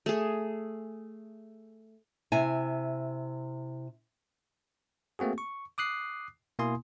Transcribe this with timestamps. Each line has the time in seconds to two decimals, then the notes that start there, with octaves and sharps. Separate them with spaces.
0.06 A3 G#4
2.32 C3 E4 G#5
5.19 A3 A#3 C4 F#4 G#4
5.38 C#6
5.78 D6 D#6 F#6 C7
6.59 B2 A#3 E4 G#5 C6 D#6